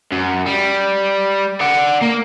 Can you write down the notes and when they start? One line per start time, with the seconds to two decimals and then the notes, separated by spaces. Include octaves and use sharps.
0.12 F#2
0.46 G3
1.61 D5 F#5
2.02 A#3